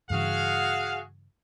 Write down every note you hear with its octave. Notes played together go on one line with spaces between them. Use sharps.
G2 C#3 E3 F#4 G#4 F5